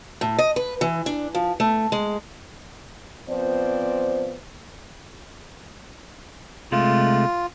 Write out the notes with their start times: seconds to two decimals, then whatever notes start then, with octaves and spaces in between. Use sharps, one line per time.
0.21 A2
0.38 D#5
0.56 B4
0.81 E3
1.06 D4
1.35 F3
1.60 A3
1.92 G#3
3.29 F3 B3 C4 F4 C5 D5
6.72 C3 G#3 A3 F4